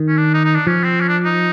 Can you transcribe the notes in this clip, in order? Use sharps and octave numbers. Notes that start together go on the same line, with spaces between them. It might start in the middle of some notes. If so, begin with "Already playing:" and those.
Already playing: D#3
C#4
D4
D#4
D#4
D4
F3 C#4
C4
C#4
D4
D#4